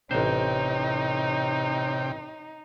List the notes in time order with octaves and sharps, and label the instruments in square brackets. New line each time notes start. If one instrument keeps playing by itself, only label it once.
[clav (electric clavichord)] A1 C5 [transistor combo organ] C3 G5 [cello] D#4 [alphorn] C#5